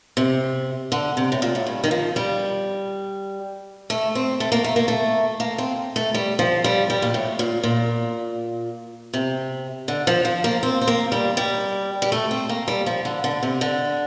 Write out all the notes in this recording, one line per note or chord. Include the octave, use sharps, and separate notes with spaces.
C3
D3
C3
A2
A#2
A2
G2
D#3
F3
G3
A3
C4
A3
A#3
A3
A#3
A3
A#3
C4
A3
G3
F3
G3
G3
A#2
A2
A#2
A#2
C3
D3
F3
F3
A#3
C4
C4
A#3
G3
G3
G3
A3
C4
A#3
G3
F3
D3
D3
C3
D3